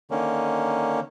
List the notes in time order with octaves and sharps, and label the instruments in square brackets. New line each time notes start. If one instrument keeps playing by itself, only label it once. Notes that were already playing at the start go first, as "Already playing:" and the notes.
[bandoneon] D3 D#3 A#3 C#4